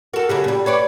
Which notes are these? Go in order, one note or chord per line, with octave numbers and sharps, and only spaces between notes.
F#4 A4 A#4
C#3 F#3 E4 G4
A#2 G3
B4 C#5 D5